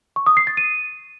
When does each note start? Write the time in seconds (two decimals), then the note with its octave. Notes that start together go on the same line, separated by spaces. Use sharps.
0.16 C#6
0.26 D#6
0.37 C7
0.47 A6
0.57 D#7